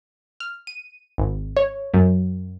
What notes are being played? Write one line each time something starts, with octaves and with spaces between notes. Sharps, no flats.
F6
D#7
G#1
C#5
F#2